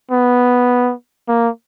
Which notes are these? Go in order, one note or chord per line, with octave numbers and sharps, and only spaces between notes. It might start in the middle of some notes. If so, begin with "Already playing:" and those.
B3
A#3